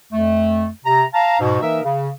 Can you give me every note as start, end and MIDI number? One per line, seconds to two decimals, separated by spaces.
0.12 0.68 41
0.12 0.68 57
0.85 1.04 48
0.85 1.04 82
1.14 1.37 77
1.14 1.37 81
1.14 1.37 82
1.40 1.58 44
1.40 1.58 47
1.61 1.79 52
1.61 1.79 58
1.61 1.79 63
1.61 1.79 70
1.61 1.79 76
1.83 2.09 49